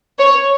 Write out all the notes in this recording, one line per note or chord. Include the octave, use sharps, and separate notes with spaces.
C#5